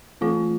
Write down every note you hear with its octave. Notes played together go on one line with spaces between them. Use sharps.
E3 A3 C4 F4